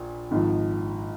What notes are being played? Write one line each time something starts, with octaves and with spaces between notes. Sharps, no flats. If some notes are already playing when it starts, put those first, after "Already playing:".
Already playing: A#1 A#2
G#1 G#2 F3